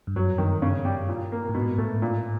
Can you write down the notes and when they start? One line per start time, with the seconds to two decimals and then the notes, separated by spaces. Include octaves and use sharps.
0.07 G2
0.15 F#2 F#3
0.38 G2 D#3
0.62 C#3
0.85 G3
1.09 A#2
1.32 A#3
1.49 A2
1.54 G#2 B2
1.78 A2 A3
2.02 A#2